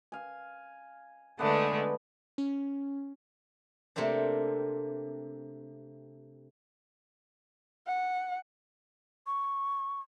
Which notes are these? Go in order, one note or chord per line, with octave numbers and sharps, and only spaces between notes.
F5 G#5
D3 G#3 A3 B3 D4 B4
C#4
C3 A3 A#3 C4 D4
F#5
C#6